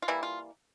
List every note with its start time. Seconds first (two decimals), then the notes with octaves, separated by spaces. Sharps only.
0.02 F4
0.08 E3 G3 A#3 E4
0.23 F4